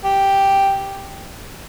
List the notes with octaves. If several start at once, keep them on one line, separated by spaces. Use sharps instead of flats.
G4